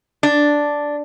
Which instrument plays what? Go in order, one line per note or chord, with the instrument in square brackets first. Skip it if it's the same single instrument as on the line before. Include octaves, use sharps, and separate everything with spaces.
[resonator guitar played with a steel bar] D4